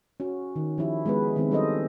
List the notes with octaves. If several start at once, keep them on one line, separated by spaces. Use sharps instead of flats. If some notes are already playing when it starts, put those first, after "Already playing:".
C#4 F#4
D#3
F3 C#4 E4 G4
G#3 B3 B4
D#3 G#3 B3 C4
G3 C#4 A4 C5 D#5